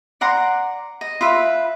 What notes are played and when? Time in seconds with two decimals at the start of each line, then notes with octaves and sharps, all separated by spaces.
0.21 D5 F#5 A#5 C6
1.01 D#5
1.21 F4 B4 E5